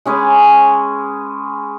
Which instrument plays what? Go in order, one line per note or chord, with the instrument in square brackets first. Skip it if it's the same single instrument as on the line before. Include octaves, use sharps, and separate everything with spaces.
[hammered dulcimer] G#3 C#4 G#4 B4